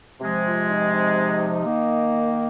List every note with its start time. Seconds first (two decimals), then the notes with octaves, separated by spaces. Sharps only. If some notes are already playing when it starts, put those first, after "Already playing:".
0.20 C3 F3 G#3
0.44 F4
0.69 D#4
0.93 D#4
1.65 D#3 A#3